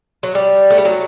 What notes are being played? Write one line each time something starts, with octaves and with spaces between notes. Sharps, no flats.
F#3
G3
A3
G3
F#3